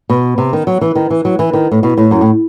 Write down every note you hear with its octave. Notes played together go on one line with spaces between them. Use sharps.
B2
C3
D#3
F#3
E3
D#3
E3
F#3
E3
D#3
A2
B2
A2
F#2
A2